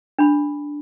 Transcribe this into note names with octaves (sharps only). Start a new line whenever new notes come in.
D4 B5